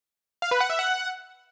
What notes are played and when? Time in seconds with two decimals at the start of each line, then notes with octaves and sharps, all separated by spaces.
0.42 F5
0.51 B4
0.60 F#5
0.70 E5
0.79 F#5